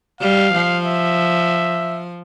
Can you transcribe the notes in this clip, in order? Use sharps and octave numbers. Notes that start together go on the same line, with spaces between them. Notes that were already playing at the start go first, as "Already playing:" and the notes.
G3 F5
F3
E5